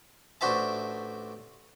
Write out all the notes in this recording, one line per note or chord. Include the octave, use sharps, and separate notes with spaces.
A1 D4 F#4 C5 E5 A5